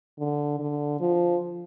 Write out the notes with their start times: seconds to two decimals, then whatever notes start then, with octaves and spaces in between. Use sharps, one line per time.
0.19 D3
0.59 D3
1.00 F3